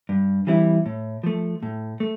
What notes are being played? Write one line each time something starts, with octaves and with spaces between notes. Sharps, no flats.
G2
E3 G3 C4 E4
A2
F3 A3
A2
A3